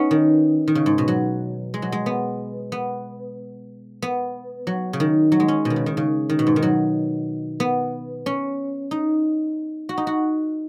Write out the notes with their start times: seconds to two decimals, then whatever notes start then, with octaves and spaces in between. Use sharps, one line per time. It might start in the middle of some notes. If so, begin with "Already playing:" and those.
Already playing: B3 C#4 D#4
0.11 D#3
0.68 D#3
0.75 C#3
0.86 G#2
0.98 B2
1.08 F#3
1.74 G#3
1.82 F#3
1.92 G#3
2.06 B3
2.72 B3
4.02 B3
4.67 F#3
4.93 C#3
5.00 D#3
5.32 F#3
5.40 G#3
5.48 C#4
5.65 B2
5.70 D#3
5.76 C#3
5.86 D#3
5.97 C#3
6.30 D#3
6.39 B2
6.47 G#2
6.56 D#3
6.62 F#3
7.60 B3
8.26 C#4
8.91 D#4
9.89 F#4
9.98 D#4
10.07 F#4